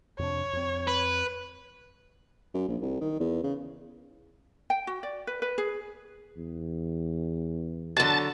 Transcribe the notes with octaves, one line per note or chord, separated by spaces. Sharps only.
F2 C3 D4 C#5
F2 C4
B4
F#2
A#1
C2
D#3
E2
C#3
G5
F#4
D5
B4
B4
G#4
E2
D3 F#3 A5 A6